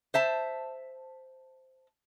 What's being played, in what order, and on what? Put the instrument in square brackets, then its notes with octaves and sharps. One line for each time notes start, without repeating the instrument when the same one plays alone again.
[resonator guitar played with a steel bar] C5 E5 A5